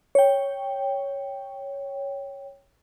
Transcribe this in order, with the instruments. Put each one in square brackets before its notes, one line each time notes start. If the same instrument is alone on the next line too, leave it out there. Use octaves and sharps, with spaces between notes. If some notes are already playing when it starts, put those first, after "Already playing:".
[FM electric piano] C#5 G5